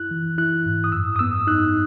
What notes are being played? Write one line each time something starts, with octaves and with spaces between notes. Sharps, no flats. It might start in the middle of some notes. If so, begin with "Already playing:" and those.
Already playing: E4 F#6
E3
E4 F#6
G#2
D#6
F#2 E6
D#6
B3 E6
D#4 F#6